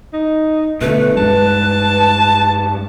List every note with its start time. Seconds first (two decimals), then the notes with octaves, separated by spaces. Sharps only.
0.13 D#4
0.81 B2 D3 A3 B4
1.17 G2 G#3 A5